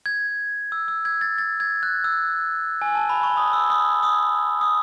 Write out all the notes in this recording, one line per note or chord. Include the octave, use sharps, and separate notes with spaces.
G#6
E6
E6
G#6
A6
A6
G#6
F#6
E6
G#5
A5
B5
C#6
D#6
E6
D#6
D#6
D#6